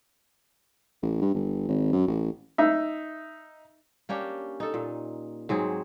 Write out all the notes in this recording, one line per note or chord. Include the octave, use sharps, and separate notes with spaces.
A1
G2
G1
G#1
F#2
A1
D#4 E5
A#3 C#4 D4 G4
D#4 A4
A#2
G#2 F#3 C4 G#4